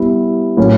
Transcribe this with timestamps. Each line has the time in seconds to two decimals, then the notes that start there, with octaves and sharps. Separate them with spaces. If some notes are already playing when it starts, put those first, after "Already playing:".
Already playing: G3 B3 E4
0.57 A2 F#3 A#3 C#4